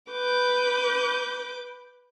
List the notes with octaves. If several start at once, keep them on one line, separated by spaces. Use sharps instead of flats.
B4 D6 G6